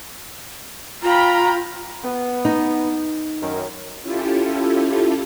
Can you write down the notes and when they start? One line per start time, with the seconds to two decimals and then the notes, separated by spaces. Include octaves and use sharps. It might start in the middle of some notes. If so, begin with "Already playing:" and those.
1.03 F4 G5 A#5 B5
2.04 B3
2.45 D#4
3.42 F#2 D#3
4.02 C#4 E4 F4 G4 A4